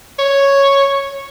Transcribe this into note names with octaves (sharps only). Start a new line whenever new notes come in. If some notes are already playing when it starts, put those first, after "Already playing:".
C#5